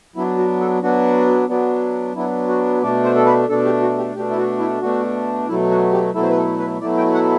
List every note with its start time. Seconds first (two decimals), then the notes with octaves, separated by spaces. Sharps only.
0.16 F#3 B3 D4 E4
0.38 F#4
0.60 A4
0.83 F#3 B3 D4 F#4
1.49 F#3 B3 D4
2.15 F#3 B3 D4 E4
2.49 F#4
2.82 B2 A3 D4 D5
3.04 C5
3.15 A4
3.26 B4
3.48 B2 A3 D4 A4
3.65 G4
3.82 F#4
3.98 G4
4.15 B2 A3 D4 G4
4.30 E4
4.37 F#4
4.59 E4
4.82 B2 A3 D4 F#4
5.48 B2 F#3 A3 E4
5.70 F#4
5.93 G4
6.14 B2 F#3 A3 E4 A4
6.22 C5
6.30 B4
6.37 A4
6.59 B4
6.81 B2 F#3 A3 E4 D5
6.98 G5
7.14 F#5